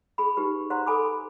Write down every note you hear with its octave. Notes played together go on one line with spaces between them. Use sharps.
G#4 B5
D#4 G4 B4
C5 F#5 A#5 C6
A4 G#5 B5 D6